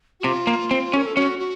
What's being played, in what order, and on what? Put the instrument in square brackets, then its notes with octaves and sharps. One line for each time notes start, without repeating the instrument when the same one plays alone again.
[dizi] F#4
[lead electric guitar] C3 [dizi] F4
[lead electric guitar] A#3
C4
C#4
[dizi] A#4
A4
[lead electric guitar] C#4 [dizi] F#4
[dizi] F#4